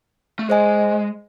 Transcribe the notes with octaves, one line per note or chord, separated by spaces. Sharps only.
A3
G#3 G#4 C5 D#5 G#5